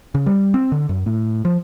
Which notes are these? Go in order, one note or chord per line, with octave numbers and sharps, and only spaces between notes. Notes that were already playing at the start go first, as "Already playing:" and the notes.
C#3
G3
C4
D3
F#2
A2
F3